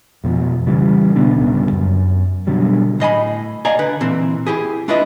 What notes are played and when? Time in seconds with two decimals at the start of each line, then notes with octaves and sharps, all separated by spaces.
0.24 F2 B2 F3
0.67 C#3 E3 G3
1.16 B2 D3 B3 D4
1.36 D1 G2 C#3 B3
1.72 F#2
2.47 B2 D3 F#3 G3
3.00 A2 D#5 G#5 B5
3.65 D5 D#5 F5 G#5 A#5
3.79 D3 B4
4.01 A#2 E3 C4
4.47 E4 G4 G#4
4.88 A3 D4 E4 F4 B4 D#5